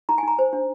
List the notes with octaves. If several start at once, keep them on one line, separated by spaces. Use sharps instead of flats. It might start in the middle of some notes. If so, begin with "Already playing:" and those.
D#4 A#5
G#5
D#4 A#5
C5
D4